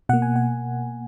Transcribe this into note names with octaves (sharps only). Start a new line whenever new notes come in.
B2 A#3 F#5
G#5
F#5